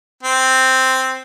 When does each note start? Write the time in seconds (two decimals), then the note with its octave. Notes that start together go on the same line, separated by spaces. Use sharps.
0.23 C4